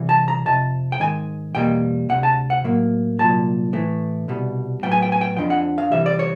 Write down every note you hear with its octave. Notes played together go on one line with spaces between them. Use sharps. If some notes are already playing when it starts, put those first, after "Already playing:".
Already playing: C2 C3 E3
A5
A#5
F2 C3 A5
G5
G#2 D#3 G#3 G#5
E2 B2 G3 A#3 G5
D2 C3 F#5
A5
F#5
A2 F#3 A#3
C2 A#2 F#3 A5
A2 E3 A3
C2 B2 G3
A2 F#3 B3 G5
G#5
G5
G#5
G5
F2 D3 F3 G5
F#5
F5
C2 C3 E3 G3 E5
D5
C#5